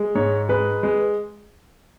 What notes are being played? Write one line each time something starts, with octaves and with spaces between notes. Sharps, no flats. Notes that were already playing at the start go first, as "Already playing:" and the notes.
Already playing: G#3
G#2 C#5
G#3 B4
G#3